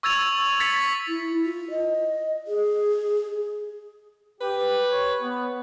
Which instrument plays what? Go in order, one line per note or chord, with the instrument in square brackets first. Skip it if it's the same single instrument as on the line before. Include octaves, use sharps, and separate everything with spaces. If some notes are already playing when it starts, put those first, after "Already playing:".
[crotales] C#6 E6 G#6 A6 F7
A6 B6 C#7
[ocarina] E4
F4
D#5
G#4
[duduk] G4 [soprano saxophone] B4
[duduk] C#5
B3